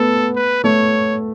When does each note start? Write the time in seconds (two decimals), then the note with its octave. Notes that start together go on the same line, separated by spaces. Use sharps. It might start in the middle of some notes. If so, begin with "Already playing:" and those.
Already playing: A3 B3 A4
0.36 B4
0.64 A3 C#5